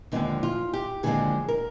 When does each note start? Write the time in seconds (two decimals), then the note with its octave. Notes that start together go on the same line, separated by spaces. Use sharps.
0.12 D#2 D3 F3 G#3 C4 D#4
0.43 F4
0.73 G4
1.03 D#2 D3 F3 G#3 C4 G#4
1.48 A#4